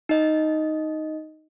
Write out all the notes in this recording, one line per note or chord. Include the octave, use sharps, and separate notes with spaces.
D#4 D#5